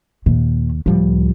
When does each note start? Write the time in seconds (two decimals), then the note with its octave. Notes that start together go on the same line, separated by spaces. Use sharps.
0.26 D#2 A#2
0.86 C#2 A2 F3 G3